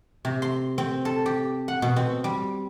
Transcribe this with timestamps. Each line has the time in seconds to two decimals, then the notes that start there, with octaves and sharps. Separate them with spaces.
0.25 C3
0.42 C6
0.78 C4
1.05 A4
1.26 G4
1.68 F#5
1.82 B2
1.96 C4
2.24 G3